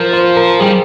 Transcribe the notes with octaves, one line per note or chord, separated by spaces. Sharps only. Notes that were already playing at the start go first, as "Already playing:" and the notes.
Already playing: F3 A#4
C5
A#4
G3 G#4